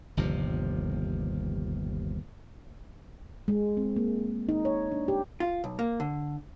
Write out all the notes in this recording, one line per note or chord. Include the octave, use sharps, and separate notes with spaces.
G1 D#2 C3 F3
G#3
C4
A#3
D#4
C#5
D4
G4
F4
B1
A#3
D3